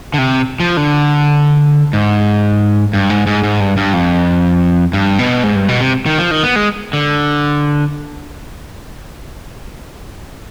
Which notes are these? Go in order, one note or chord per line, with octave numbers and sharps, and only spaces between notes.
D3
C3
F3
D3
G#2
G2
G#2
G#2
G#2
G2
G2
F2
G2
B2
G#2
G2
B2
C3
D#3
F3
D#3
B3
G#3
D3